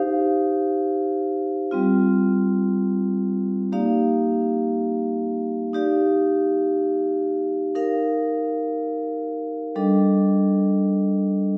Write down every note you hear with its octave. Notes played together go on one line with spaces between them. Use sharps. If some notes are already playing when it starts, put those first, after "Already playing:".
Already playing: D#4 G4 C5 F5
G3 C4 F4
A#3 D#4 G4 D5 F5
D#4 G4 D5 F5
D#4 A#4 F5
G3 D4 A4 D#5